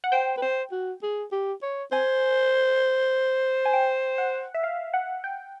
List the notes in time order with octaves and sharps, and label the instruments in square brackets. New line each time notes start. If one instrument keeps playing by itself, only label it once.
[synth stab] F#5
[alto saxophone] C5 [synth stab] G5
[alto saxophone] B4
C5
F#4
G#4
G4
C#5
[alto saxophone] C5 [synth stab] G#5
[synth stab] G#5
G5
F#5
E5
F5
F#5
G5